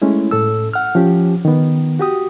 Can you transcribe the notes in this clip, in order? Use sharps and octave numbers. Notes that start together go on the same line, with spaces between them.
G#3 A3 C#4 E4
A2 A4 E6
F#5 F6
F3 C#4 G4
D#3 B3
F#4 G4 D#6